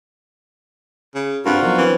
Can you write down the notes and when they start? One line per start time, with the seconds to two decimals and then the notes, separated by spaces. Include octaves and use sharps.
1.15 C#3
1.45 G2 C4 D4 F4 F#4 A#4
1.62 D#3 F3 F#3 B3
1.78 E3 C4